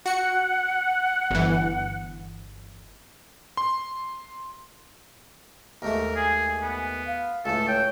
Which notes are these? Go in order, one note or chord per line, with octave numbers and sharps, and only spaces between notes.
F#4 F#5 C#7
G1 E3
C6
D#2 G#2 A3 A#4
G#4 G#5
B3
F5
C#2 A2 A4
C#5 G5